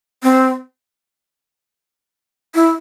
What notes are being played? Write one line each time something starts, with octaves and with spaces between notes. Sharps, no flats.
C4
E4